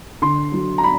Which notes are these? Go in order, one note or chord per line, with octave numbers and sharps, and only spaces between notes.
D3 C6
F#3
A#5
B5